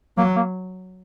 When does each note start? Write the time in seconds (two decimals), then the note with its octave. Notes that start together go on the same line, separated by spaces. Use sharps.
0.17 F#3 A#3
0.36 A#3